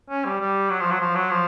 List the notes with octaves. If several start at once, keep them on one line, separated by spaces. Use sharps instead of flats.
C#4
G3
G3
F#3
F3
F#3
F3
F#3
F3